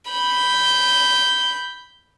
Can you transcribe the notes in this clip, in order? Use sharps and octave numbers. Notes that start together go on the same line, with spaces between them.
B5 G6